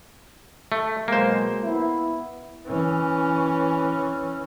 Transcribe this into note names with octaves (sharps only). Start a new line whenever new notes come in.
A3
B2 F#3 G#3 A#3 C5
B3 E4
E3 C#4